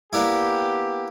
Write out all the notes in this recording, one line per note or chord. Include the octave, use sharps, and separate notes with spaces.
A#3 B3 D4 E4 G4